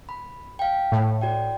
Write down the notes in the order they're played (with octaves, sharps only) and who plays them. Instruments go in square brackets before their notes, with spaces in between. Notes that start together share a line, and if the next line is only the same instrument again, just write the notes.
[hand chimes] B5
F5 G5
[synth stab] A2
[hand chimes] F#4 D5 G5